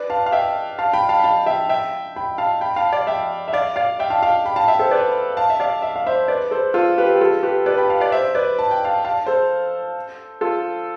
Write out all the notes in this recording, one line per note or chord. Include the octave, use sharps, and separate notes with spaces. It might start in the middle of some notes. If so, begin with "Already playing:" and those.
Already playing: B4 D5
F5 A5
F5
E5 G5
F5 A5
G5 B5
F5 A5
B5
F5 A5
E5 G5
E5 G5
G5 B5
F5 A5
G5 B5
F5 A5
D5 F5
E5 G5
E5
D5 F5
D5 F5
E5 G5
F5 A5
F5 A5
G5 B5
F5 A5
E5 G5
A4 C5
B4 D5
F5 A5
E5
D5 F5
E5
F5
C5 E5
B4 D5
A4 C5
F4 A4
G4 B4
G4
F4 A4
G4 B4
B4 D5
G5 B5
F5 A5
D5 F5
C5 E5
B4 D5
A5
G5
F5 A5
F5 A5
A4 C5
F4 A4